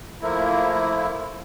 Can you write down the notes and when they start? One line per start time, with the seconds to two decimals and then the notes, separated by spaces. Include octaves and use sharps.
0.21 F3 A3 A#3 E4